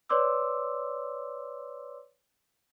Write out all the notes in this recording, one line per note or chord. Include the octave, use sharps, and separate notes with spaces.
B4 C#5 D5 C6 D6 E6